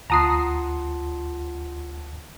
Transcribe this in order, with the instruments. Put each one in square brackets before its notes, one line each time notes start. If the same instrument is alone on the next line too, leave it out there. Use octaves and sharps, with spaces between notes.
[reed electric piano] D2 [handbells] F4 F#5 A5 [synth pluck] A#5 D#6 C7